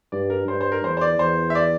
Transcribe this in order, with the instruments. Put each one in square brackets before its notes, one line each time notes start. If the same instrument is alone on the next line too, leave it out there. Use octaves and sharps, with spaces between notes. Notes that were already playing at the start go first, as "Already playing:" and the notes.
[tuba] G2 [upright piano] D5
[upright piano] A#4
[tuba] G2 [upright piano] C5
[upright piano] C5
A#4
[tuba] E2 [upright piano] C5
[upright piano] C5
D5
[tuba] E2 [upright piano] C5
[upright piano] E5
D5